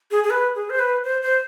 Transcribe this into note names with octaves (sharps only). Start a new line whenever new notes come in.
G#4
G#4
B4
G#4
C5
B4
C5
C5